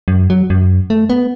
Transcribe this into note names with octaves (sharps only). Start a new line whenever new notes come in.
F#2
F#3
F#2
A3
B3